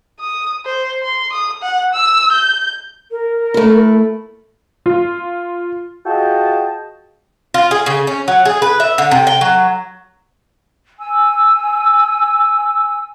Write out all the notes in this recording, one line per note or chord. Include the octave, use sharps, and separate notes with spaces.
D#6
C5
C6
D#6
F#5
E6
G6
A#4
A3 E4
F4
F4 F#4 G#4 D#5 G5 A5
F4
G#4
C#3
C#4
F#3
G#4
B4
E5
D3
C3
G5
F#3
G#5 E6